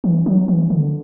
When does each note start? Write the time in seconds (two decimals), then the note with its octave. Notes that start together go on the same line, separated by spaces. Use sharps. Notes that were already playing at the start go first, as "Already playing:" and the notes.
0.04 E3
0.26 F#3
0.48 E3
0.70 D3